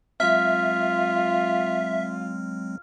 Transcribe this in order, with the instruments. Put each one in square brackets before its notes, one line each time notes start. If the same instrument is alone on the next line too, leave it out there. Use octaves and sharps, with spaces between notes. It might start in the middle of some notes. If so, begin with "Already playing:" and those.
[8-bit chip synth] F#3 G#3 C4 [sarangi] F4 [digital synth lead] E5 [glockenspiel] F6